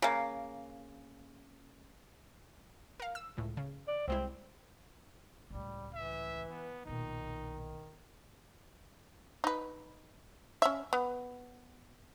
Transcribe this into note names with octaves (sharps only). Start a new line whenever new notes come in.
C#3 A#3
A#4 F5
E6
C#2 A2
C#3
D5
C2 G#3 C4 E4
C#2 A2 G3
E3 E5
B3
B1 A#2 D#3 D#4
D#4 B4
C#4 E5
B3